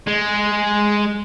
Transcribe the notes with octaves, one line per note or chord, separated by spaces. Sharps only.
G#3